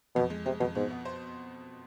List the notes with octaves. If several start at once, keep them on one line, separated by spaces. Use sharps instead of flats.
F2 B2
G#3
C3 G#3
F2 B2
G#2 B2
B3
C5